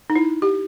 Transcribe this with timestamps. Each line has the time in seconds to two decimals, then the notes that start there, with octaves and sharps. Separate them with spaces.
0.10 D#4
0.15 E4
0.42 G4